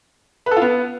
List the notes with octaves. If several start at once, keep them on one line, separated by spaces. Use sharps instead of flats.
B4
A4
F4
B3